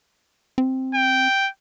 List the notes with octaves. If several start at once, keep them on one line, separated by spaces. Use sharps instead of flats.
C4
G5